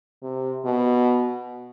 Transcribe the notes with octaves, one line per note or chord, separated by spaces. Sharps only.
C3
B2